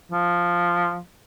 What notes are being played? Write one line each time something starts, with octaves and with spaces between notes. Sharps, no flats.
F3